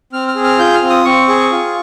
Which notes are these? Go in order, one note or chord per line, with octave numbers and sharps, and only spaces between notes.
C4 F6
F6
G#4
F6
F4 G6
F6
C4
D#6
C4 C#6
G#4
F4